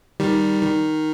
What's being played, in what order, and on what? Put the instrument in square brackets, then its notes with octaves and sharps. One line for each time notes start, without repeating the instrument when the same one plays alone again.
[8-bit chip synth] D#3 G3
D#3